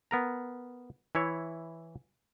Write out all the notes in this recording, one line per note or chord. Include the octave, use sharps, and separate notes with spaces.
B3 A#4 A#5
E3 E4 C#5